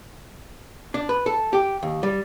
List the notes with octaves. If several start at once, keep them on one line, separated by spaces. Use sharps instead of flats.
D4
B4
A4
G4
D#2
G3